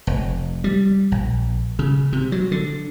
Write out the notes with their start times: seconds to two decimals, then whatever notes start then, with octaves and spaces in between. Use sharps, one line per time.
0.07 F1
0.64 G3
1.12 A#1
1.79 C#3
2.13 C3
2.32 F#3
2.51 D3